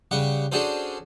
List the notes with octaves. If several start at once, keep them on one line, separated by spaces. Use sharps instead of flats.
C#3 G3 F#5 C#6
C#4 D4 F#4 G#4 A4 C5